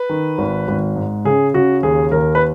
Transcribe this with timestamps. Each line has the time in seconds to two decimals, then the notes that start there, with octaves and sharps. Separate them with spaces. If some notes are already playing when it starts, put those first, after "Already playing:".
Already playing: B4
0.09 D#3
0.38 G#1
0.68 G#1
0.96 G#2
1.25 C#3 G#4
1.54 C#3 F#4
1.83 D#2 G#4
2.12 D#2 A#4
2.35 B4